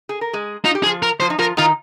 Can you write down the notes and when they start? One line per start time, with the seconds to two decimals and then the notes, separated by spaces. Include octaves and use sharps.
0.09 G#4
0.21 A#4
0.33 G#3 G#4
0.65 D#4 F4
0.75 G4
0.83 F3 F4 G#4
1.03 A#4
1.20 F3 F4 C5
1.30 D#4
1.39 F3 F4 A#4
1.57 D#3 D#4 F4